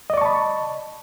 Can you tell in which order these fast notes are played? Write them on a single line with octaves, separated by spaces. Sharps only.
D#5 D5 C#6 A5 B5